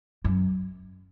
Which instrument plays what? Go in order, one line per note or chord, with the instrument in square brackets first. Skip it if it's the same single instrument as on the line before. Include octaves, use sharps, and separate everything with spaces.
[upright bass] F#2